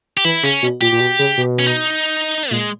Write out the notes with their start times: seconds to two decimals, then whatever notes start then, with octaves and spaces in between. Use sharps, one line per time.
0.17 G4
0.25 E3 E4
0.43 C#3 C#4
0.63 B2
0.81 A#2 G4
0.92 A#2
1.00 B2
1.19 C#3
1.37 B2
1.59 C#4
1.66 D#4
2.51 A#2 G#3